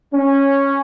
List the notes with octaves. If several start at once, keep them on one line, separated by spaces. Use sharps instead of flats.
C#4